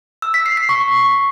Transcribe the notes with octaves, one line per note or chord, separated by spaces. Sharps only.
E6
B6
C7
C7
C#6